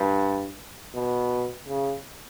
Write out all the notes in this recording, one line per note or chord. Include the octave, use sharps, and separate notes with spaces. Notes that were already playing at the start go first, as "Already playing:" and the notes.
Already playing: G2
B2
C#3